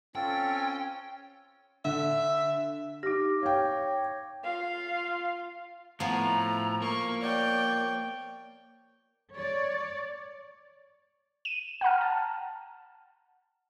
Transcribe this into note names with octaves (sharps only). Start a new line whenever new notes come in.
C4 C#4 F4 A4 G5
D3 E5
D#4 G4 D6 A#6
C#5 F5 G5
F4 F5
A2 F3 B3 A#5
A#3 C#6
C#5 D5 G5
C#5 D5
D#7 E7
F#5 G5 A#5 F6
A5